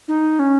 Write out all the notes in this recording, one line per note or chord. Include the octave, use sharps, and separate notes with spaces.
D#4
C#4